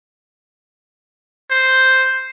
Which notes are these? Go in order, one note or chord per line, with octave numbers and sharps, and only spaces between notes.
C5